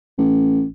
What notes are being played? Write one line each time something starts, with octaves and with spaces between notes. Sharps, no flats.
A1